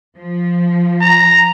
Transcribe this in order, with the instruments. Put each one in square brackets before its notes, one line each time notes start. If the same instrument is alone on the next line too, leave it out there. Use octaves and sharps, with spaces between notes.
[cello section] F3
[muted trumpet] A#5